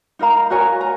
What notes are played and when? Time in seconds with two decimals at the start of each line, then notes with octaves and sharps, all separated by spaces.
0.19 D#4 A#4 F5 A#5
0.50 F#4 A#4 C#5 G#5
0.81 A#5